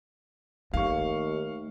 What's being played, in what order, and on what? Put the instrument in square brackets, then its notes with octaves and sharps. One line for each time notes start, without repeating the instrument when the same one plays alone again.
[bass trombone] D#2 [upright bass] A3 [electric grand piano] F5 C#6